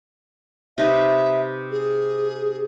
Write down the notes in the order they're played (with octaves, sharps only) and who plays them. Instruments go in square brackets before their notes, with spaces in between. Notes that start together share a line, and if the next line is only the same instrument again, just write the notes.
[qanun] C3 D#4 B4 [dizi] E5
[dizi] G#4